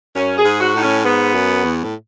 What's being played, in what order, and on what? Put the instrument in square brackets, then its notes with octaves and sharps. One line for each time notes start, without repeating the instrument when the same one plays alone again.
[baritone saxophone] F#2 [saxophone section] C#4
[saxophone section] G#4
[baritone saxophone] G#2
[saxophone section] F#4
[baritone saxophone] A2 [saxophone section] D#4
[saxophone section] C#4
[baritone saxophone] G#2 [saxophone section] B3
[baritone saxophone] F#2
E2
A2